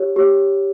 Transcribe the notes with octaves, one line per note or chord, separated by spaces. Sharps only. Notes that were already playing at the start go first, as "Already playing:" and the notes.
Already playing: G4 C#5
G4 C#5